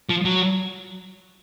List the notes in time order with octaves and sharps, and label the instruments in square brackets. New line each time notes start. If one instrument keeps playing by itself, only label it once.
[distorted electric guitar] F3
F#3